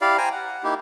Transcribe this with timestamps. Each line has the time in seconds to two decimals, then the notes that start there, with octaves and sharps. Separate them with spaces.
0.01 E4 G4 D5 F5
0.18 C5 G5 G#5 A#5
0.32 F#5
0.63 A#3 D#4 E4 G4